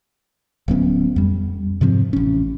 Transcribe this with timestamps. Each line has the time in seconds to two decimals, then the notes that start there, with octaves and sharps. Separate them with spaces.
0.68 D1 F#3 B3 C#4
1.16 F2 G3
1.81 G#2 C3 F3 C4
2.13 A1 C#4